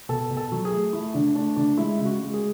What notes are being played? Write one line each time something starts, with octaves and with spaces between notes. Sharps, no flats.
B2 A4
B2
A4
F#3
G#4
A3
A3 E4
D3 D4
A3 D4
D3 D4
G#3 E4
C#3
F#4
G#3
G#4